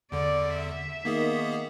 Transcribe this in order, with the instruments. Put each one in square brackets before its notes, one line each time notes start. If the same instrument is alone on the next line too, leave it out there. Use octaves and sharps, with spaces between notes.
[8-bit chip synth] E2 D3 [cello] D5
[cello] E5
[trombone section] D#3 [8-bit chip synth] A#3 B3 G#4